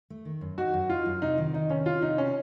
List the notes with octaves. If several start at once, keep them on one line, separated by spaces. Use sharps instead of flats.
A3
D#3
F#2
D#4 F#4
F#2
D#4 F4
F#2
C3 D#4
D#3
D#3 D#4
C3 C#4
C3 F4
C3 D#4
C#4